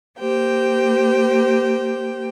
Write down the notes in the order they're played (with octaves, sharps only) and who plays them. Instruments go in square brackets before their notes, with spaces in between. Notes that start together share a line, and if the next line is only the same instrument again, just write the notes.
[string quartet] A#3 G4 C5 G5